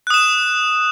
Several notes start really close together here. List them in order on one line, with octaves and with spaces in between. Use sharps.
F#6 D#6 E7